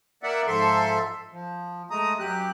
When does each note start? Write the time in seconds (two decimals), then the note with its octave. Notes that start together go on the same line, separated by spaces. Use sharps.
0.23 A#3 D5 E5 F#5
0.47 G#2 F3 A4 E5 C6
1.32 F3
1.90 G#3 A3 A#5 D#6
2.19 F#2 F#3 G4 F#6